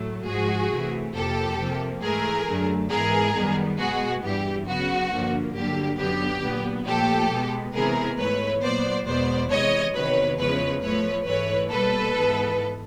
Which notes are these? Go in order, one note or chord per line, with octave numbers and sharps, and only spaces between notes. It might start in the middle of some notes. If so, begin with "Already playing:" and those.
Already playing: A2 F#3 A3
G#2 F3 G#3 F#4 G#4
C3 E3 A3
F2 C3 F3 A#3 G4 A4
C3 F3 A#3
G#2 E3 A3 G#4 A#4
F#2 D3 F#3 A3
G#2 E3 G#3 B3 G#4 A#4
F#2 D#3 G3 B3
B2 G#3 B3 F#4 G#4
G2 E3 G3 G4
C#3 F#3 B3 F#4
G2 D3 F3 A#3
G2 D3 F#3 A#3 G4
F#2 D3 F#3 B3 G4
A#2 F#3 B3
A#2 F3 A3 G4 A4
B2 G#3 B3
C3 E3 G#3 B3 G#4 A#4
G#2 E3 A3 B4 C#5
A#2 F#3 B3 C5 D5
E2 B2 G#3 B3 C5 D5
C3 E3 G#3 C#5 D#5
E2 C3 D#3 F#3 B4 C#5
E2 C#3 F3 G#3 B4 C#5
A2 F3 A3 B4 C#5
G#2 E3 A3 B4 C#5
B2 G3 A#3 A4 B4
G#2 E3 G#3 B3